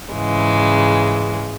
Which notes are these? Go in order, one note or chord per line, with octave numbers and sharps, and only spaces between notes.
G#2 C#3 E3 G#3